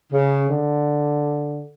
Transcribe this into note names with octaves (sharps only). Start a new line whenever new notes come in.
C#3
D3